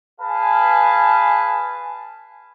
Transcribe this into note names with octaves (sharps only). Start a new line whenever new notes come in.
G#4 B4 F5 G#5 A5